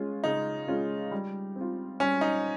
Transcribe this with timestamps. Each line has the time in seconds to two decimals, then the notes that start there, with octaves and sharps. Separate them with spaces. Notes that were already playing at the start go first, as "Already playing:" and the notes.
Already playing: G#3 C#4 F4
0.24 C#3 D#4
0.67 G#3 C#4 F4
1.11 G3
1.56 C4
1.61 F4
2.00 G3 C#4
2.21 D#4